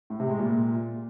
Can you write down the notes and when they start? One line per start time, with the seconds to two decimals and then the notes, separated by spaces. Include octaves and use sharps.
0.10 A2
0.20 C3
0.29 G#3
0.39 A#2